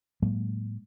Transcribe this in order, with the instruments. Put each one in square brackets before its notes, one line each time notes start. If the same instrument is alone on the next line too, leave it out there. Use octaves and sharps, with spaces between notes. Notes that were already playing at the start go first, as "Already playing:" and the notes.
[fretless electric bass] A2 F#3 G#3 A#3